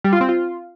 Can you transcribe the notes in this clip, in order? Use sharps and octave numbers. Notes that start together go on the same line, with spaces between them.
G3
F4
C4
F4